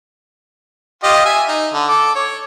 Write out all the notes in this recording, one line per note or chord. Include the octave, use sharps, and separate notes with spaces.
F4 G4 D#5
E5 G#5
D#4
D3
A4 D6
C#5